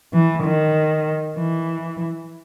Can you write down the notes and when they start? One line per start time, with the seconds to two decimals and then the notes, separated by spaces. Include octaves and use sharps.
0.13 E3
0.44 D#3
1.37 E3